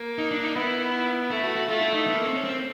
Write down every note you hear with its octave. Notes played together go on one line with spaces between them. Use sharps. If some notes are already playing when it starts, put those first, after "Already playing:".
Already playing: A#3
D#4
D4
D#4
B3 E4
A3 E4
F#4
F#4
A3 F4
E4
D#4
B3
A#3
C4
C#4
C4